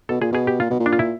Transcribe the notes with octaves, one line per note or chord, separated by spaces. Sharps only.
B2 A4
A#2 G#4
B2 G#4
G4
A#2 F4
B2
A#2
D4
F4
E4